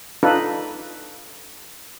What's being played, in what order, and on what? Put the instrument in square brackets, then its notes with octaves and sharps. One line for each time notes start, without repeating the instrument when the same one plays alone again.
[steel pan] D4 D#4 F4 A4 B4